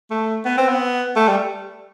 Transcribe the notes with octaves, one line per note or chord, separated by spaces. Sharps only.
A3
B3
C4
B3
A3
G3